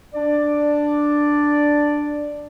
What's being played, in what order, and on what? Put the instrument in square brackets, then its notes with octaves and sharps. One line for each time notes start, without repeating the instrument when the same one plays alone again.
[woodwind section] D4 D5